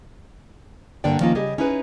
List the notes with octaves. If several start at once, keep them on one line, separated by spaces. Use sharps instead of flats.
G2 D3 A#3 D5 G5
D#3 F3 A#3 C#4 D#4 F4
C#3 G3 G4 G#4 D#5
C#4 D#4 E4 G#4 B4